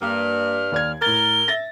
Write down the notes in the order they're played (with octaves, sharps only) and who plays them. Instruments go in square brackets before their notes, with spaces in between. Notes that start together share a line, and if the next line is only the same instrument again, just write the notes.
[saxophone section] G2 [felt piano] A#3 [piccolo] F6
[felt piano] D#2 D5 G#6
[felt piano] A2 A6 [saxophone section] A#4 [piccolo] G7
[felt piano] E5 A6 A#6